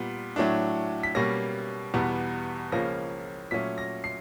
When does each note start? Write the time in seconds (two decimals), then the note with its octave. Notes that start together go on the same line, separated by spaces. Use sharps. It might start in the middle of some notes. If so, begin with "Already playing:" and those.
Already playing: A#2 G3 B3
0.36 A2 F#3 A3 D4
1.03 B6
1.15 B2 G3 A#3 C#4 A#6
1.94 E2 B2 G3 B3
2.72 C#2 C#3 F3 A#3 C#4 A#6
3.51 A#2 F#3 A3 C#4 B6
3.78 A#6
4.04 C7